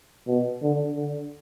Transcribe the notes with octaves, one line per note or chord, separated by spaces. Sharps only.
B2
D3
D3